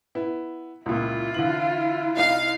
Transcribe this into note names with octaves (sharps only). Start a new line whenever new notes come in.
B3 E4
C#2 A#2 E4 F4
D3 E3 F#7
C2 D#4 F5